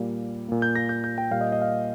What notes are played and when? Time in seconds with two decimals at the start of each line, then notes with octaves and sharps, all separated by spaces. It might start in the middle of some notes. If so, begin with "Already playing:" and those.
Already playing: A#2 G3 A#3
0.48 A#2 A#3
0.62 G6
0.76 A#6
0.89 G6
1.04 G6
1.18 G5
1.31 A#2 G3 A#3 F5
1.41 D#5
1.52 D#5
1.62 F5